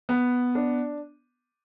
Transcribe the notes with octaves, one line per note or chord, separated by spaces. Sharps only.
B3
D4